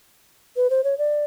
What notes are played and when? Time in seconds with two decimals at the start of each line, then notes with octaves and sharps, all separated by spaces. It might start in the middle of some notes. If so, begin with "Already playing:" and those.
0.56 B4
0.70 C5
0.84 C#5
0.98 D5